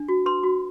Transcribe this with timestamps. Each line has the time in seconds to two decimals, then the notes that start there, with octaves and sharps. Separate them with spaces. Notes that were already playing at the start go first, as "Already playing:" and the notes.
Already playing: D4
0.08 F#4
0.26 B4 C6
0.43 F#4